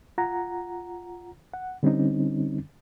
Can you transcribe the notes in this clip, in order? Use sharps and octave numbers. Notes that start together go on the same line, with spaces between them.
F4 F#5 A#5
F#5
D3 G3 C4 C#4 D#4